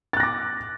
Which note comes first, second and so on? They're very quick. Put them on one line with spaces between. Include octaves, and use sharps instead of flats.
A6 F#6 A#6 D6